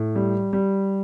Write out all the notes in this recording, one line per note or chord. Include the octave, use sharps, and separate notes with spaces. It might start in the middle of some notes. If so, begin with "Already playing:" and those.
Already playing: A2
G3
G3